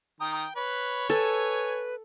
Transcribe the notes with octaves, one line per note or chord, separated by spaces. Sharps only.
D#3 G5 A#5 D#6
B4 C#5
A4 B4 G#5